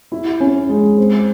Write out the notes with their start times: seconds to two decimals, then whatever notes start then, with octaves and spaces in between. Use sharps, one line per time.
0.12 E4
0.40 C#4
0.69 G#3
0.98 C4